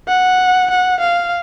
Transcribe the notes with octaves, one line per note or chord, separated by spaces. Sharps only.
F#5
F#5
F5